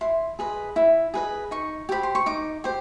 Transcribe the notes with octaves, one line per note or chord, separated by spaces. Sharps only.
E4 C6
G#4 B4 D#5
E4
G#4 B4 D#5
D#4 C#6
G4 C5 B5
C6
C#6
D#4 D6
G4 C5